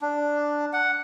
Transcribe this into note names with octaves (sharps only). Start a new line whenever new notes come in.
D4
F#5